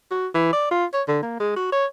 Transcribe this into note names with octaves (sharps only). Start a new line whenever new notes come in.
F#4
E3
D5
F4
C#5
D3
A#3
G#3
F#4
C#5